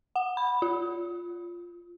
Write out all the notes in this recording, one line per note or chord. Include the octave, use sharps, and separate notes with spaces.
F#5
B5
F4